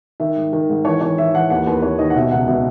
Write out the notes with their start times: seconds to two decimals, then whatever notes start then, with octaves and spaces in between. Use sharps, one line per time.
0.20 D#3 E5
0.36 G#2
0.53 D#3
0.70 G#2
0.85 E3 C#5
1.01 E3 C#5
1.18 E3 E5
1.34 E3 F#5
1.50 D#2 F#5
1.66 D#2 B4
1.79 B4
1.82 D#2 C#5
1.99 D#3 D#5
2.10 F#5
2.16 B2 E5
2.31 C#2 F#5
2.47 B2 E5